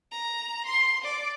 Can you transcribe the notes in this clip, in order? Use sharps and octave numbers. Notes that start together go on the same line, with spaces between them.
A#5
C6
D5